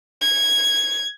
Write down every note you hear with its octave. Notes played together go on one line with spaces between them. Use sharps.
G#6